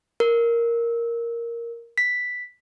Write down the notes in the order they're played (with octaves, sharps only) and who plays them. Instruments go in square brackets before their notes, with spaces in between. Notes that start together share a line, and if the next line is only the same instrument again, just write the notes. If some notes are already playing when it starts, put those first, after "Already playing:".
[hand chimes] A#4
B6